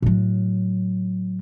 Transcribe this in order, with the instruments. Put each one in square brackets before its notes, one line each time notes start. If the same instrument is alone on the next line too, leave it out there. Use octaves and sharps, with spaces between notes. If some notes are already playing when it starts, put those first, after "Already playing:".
[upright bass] A2 F#3